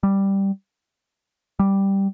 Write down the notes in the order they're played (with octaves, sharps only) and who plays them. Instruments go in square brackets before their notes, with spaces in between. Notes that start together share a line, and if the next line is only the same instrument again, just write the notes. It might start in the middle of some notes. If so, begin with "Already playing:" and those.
[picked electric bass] G3
G3